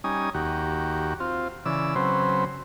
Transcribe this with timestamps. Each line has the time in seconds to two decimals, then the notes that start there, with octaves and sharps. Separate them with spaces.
0.04 G3 C#4 D#4 G#5 D#6
0.34 D#2 F#4 G4
1.20 C4 F4
1.66 C#3 E3 D5 E6
1.95 C#3 F#3 C4 B4 C5